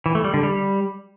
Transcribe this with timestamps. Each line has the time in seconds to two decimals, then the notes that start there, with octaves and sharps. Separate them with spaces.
0.06 E3
0.15 A3
0.24 G3
0.34 D3
0.43 G3